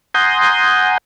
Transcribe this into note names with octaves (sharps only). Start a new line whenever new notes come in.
F#5 G#5 A#5 C6 D#6 G6